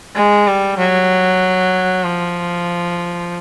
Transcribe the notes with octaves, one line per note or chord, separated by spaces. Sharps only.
G#3
G3
F#3
F3